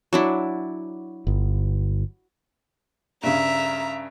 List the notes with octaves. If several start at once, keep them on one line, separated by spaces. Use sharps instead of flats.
F#3 D4 E4
G1
G2 C#3 E5 A#5